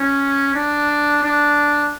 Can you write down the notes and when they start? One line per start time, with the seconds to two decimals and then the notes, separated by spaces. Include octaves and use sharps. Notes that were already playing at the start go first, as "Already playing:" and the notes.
Already playing: C#4
0.55 D4
1.23 D4